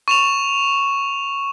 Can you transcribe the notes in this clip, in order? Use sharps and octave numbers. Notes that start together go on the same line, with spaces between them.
C#6 E7 F7